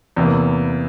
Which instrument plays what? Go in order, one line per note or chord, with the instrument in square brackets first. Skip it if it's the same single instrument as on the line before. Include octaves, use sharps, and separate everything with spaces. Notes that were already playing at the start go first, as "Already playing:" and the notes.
[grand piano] E2 C3 E3 A#3